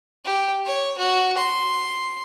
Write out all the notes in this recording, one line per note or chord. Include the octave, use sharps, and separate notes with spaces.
G4
C#5
F#4
C6